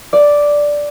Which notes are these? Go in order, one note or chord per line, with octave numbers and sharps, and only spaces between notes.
D5